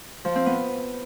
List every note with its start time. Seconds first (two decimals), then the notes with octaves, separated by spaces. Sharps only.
0.25 F3
0.35 C4
0.46 B3